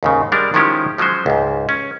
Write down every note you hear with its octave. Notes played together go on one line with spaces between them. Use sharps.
D#2 G#2 C#3
G3 G#3 D4 A#4
D#3 F3 G#3 C#4 E4 G4
F3 F#3 G#3 C#4 C5
C#2 G#2
C#4